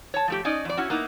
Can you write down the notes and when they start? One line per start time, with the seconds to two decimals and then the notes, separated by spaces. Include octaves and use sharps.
0.14 C#5 A5
0.28 F3 A3 G4
0.45 C#4 D#4 D5 D#5
0.65 F2 D5
0.77 C#4 E4 F#4
0.90 A#3 B3 D#4 E4